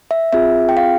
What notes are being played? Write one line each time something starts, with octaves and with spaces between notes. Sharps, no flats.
E5
C4 F4 G#4 E5
G5
F5